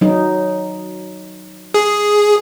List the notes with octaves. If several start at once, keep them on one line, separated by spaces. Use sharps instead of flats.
F#3 D#4
G#4